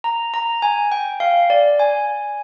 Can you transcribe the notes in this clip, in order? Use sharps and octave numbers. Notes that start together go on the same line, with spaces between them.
A#5
A#5
G#5
G5
F5
D5
G#5